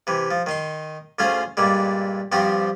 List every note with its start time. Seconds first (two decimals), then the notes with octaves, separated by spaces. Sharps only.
0.07 C3 E3
0.31 F3
0.46 D#3 D#4 C6
1.19 D2 C#4 F4 G#4 C5
1.57 G2 A#2 G3 G#3
2.32 G2 F3 C4 F#4 G4